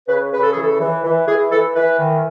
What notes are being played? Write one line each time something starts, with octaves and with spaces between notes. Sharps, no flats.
C#3 B4
C#3 B4
A4
E3 G#4
A4
E3
E3
E3 G#4
E3 A4
E3 B4
D#3